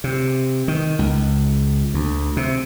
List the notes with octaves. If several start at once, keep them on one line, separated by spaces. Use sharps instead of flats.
C3
D#3
C#2
D2
C3